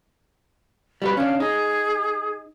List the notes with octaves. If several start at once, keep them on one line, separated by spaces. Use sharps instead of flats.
G3 F#4 B4
C#4 D4 F5
D#4 G#4